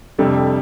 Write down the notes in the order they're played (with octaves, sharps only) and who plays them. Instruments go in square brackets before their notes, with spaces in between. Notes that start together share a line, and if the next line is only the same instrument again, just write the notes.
[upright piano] F2 C3 G3 D4 A4